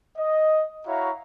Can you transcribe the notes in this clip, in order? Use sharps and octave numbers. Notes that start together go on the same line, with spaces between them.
D#5
E4 F#4 C#5 E5 F5 A#5